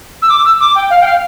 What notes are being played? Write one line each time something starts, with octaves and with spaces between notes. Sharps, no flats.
E6
D6
E6
D6
G5
F5
G5
F5